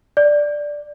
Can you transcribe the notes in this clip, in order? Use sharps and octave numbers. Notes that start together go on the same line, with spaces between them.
D5